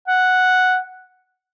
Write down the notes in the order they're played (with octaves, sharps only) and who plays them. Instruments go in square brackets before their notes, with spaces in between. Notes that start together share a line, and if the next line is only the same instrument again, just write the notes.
[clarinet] F#5